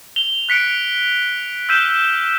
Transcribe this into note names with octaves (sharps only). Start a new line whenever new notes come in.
F7 G7
F#6 B6 C#7 D7
E6 F6 G6 B6 D#7 E7